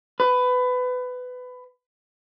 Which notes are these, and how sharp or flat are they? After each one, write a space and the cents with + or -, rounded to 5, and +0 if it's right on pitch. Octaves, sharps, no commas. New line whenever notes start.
B4 +20